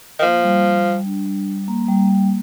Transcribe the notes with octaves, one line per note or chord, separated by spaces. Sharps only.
D#3
F3 A#3
G3
G3
G3
D4
G3
G3
A#3
G3
A#3